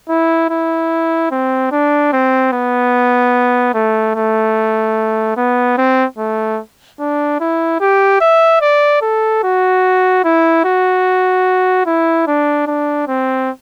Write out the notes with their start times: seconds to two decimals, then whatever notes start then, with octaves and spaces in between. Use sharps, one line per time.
0.09 E4
0.50 E4
1.31 C4
1.72 D4
2.13 C4
2.53 B3
3.74 A3
4.15 A3
5.37 B3
5.78 C4
6.18 A3
7.00 D4
7.40 E4
7.81 G4
8.21 E5
8.62 D5
9.02 A4
9.44 F#4
10.25 E4
10.65 F#4
11.86 E4
12.28 D4
12.67 D4
13.08 C4